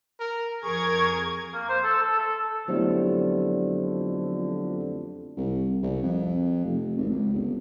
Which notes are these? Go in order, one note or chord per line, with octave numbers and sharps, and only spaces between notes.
A#4
F2 G#4 A#4 C#6 G#6
A#3
C5
A4
A4
A4
F2 D3 F#3 A3 B3 E4 G4 C5
C2
C2
F2
F1
G#1
C#2
G1